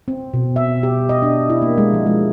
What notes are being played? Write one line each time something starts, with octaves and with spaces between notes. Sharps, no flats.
C4
B2
E5
G4
D#5
D4
E4
A#3
G#3
F3
G#3